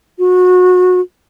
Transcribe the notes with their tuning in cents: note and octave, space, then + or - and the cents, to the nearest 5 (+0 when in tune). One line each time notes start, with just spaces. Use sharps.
F#4 -25